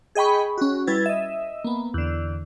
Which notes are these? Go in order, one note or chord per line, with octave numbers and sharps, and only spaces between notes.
G#4 D#5 G5 B5 C#6
C#4 F#4
G3 E4 B4 G#6 A6
D#5 E5
A#3 B3
E2 D3